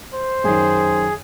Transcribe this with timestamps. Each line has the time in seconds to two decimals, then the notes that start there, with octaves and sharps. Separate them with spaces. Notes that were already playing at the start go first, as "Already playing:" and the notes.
0.14 C5
0.44 F#2 D#3 G#4